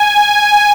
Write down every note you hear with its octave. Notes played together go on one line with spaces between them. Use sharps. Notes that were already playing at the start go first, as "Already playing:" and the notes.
Already playing: G#5